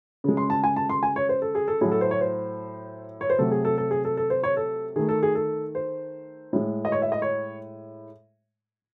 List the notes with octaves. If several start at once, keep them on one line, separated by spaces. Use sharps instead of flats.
C#3 G#3
C6
A5
G#5
A5
C6
G#5
C#5
C5
A4
G#4
A4
A2 F#3 A3 G#4
A4
C5
C#5
C5
C#5
C5
C3 F#3 A3 A4
G#4
A4
A4
G#4
A4
A4
C5
C#5
A4
D#3 A3 G#4
A4
G#4
A4
C5
A2 G#3
D#5
C#5
E5
D#5
C#5